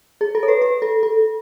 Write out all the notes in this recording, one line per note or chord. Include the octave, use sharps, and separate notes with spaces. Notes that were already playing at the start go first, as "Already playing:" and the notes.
G#4
A4
C#5
B4
B4
A4
A4